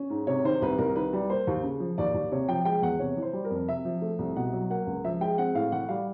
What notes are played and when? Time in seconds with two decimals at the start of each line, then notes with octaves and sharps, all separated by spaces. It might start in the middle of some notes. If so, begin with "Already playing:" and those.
Already playing: C#4
0.10 G#2
0.27 C3 C#5
0.45 D#3 C5
0.62 C2 B4
0.78 C2 A#4
0.95 D#3 B4
1.13 G3
1.30 A#3 C5
1.47 D#2
1.63 C#3
1.80 F3
1.98 D#2 D5
2.14 D#2
2.32 C3 C#5
2.48 F3 G5
2.65 G#3 G5
2.82 E2 F#5
2.99 C3 C#5
3.17 E3
3.22 C5
3.33 G3
3.45 A#4
3.50 F2
3.68 C3 E5
3.85 F3
4.02 A3
4.19 C2
4.36 B2 F#5
4.53 F#3
4.70 A#3 F#5
4.87 C#2
5.04 F3 E5
5.21 G#3 G5
5.38 C4 F#5
5.54 A2 F5
5.72 E3 F#5
5.88 G3 F5